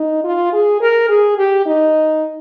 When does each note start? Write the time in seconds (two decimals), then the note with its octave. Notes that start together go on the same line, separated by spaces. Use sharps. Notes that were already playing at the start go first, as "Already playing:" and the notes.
Already playing: D#4
0.24 F4
0.53 G#4
0.81 A#4
1.09 G#4
1.38 G4
1.66 D#4